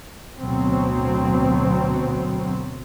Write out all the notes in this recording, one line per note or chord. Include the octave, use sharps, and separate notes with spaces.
A1 D2 B2 F#3 C4